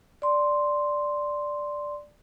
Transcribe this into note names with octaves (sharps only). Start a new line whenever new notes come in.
D5 C6